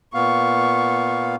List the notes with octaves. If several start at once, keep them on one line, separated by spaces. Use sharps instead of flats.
A#2 B3 F5 C#6